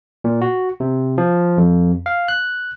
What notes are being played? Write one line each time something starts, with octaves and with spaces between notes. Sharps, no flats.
A#2
F#4
C3
F3
F2
F5
F#6